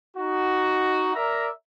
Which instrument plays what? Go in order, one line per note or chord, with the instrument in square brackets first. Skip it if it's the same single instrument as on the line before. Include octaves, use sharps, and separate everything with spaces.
[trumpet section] D#4 F#4
A#4 D5 E5 A#5